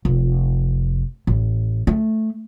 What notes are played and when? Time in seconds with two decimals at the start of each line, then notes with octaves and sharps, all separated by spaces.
0.05 F1
1.27 A1
1.87 A3